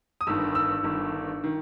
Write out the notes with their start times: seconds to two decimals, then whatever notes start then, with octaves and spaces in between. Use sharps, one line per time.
0.21 D#6
0.27 G1 G2 D#3 E6
0.55 E6
0.83 G1 G2 D#3
1.44 D#3